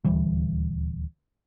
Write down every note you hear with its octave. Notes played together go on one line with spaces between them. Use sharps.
D#1 D2 E3 G3